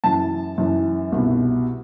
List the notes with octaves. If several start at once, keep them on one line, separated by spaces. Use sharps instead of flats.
F#2 E3 A5
F#2 E3
C2 B2